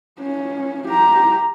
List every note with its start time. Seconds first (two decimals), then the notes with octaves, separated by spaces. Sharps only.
0.20 C#4
0.88 G4 A#5